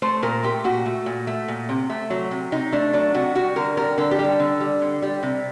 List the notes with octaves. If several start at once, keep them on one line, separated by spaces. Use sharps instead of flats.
A3 C5
A#2 A#4
A3 G4
A#2 F#4
A3
A#2
A3
A#2
C3
A3
F#3
C3
C3 D#4
A3 D4
F#3 D4
C3 F#4
G3 F#4
D3 A#4
G3 A#4
D3 A4
G4
G3
A4
D3
G3
D3
G3
C3